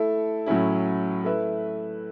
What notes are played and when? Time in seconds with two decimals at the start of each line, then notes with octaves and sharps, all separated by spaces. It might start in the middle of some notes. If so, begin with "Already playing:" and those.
Already playing: A3 E4 A4
0.46 A2 F#3 C#4 E4
1.24 A3 E4 B4 E5